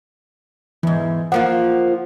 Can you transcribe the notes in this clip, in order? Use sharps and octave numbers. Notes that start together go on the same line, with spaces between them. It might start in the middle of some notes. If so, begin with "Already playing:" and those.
E2 G#2 E3
F3 A#3 F4 F#5